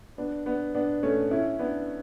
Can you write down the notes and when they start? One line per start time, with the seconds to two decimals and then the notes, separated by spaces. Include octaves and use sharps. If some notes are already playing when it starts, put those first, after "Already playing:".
0.18 B3 D4
0.46 B3 D4
0.75 B3 D4
1.03 A3 C#4
1.31 C#4 E4
1.59 B3 D4